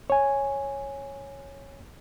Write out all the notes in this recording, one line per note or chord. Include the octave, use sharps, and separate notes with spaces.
C#5 G#5